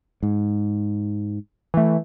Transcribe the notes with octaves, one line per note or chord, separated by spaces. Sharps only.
G#2
E3 A3